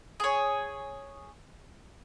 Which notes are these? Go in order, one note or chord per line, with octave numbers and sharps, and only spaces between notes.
G#4 C#5